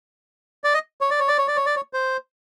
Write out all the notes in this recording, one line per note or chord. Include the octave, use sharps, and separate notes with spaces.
D5
D#5
C#5
D5
C#5
D5
C#5
D5
C#5
D5
C#5
C5